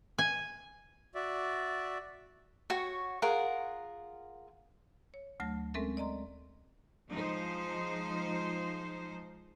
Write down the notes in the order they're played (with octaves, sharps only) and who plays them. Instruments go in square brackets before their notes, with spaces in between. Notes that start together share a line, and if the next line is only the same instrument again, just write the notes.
[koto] G#5
[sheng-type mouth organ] F#4 D5 E5
[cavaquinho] F#4 C#5 C#6
F4 G#4 A#4 F#5
[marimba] C#5
D2 F#3 A3 A5 A#6
G#3 C4 C#4 A4 A#4 E5
D5 D#5 A#5 C6
[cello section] F3 G#3 D#4 C5